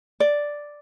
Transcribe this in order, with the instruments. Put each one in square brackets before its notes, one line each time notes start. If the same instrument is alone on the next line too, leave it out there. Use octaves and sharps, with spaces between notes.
[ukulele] D5